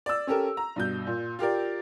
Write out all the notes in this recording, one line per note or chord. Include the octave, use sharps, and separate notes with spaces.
D5 E6
C#4 G4 A4 A#4
A#5
G2 B2 G6
A#2
F4 G4 A#4 D5